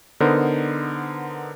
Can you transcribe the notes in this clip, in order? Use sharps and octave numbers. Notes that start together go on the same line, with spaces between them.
D3 B3 D#4 A#4 C5